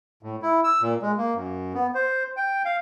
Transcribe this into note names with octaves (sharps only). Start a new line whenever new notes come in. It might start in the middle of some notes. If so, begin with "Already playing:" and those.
A2
E4
E6
A#2
G#3
A#3
F#2
B3
C5
G5
F5